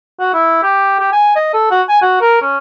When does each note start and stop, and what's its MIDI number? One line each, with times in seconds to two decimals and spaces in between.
0.20 0.30 66
0.34 0.59 64
0.63 0.97 67
1.00 1.10 67
1.12 1.34 80
1.36 1.52 75
1.54 1.66 69
1.71 1.82 66
1.89 2.00 80
2.02 2.18 66
2.21 2.40 70
2.42 2.58 61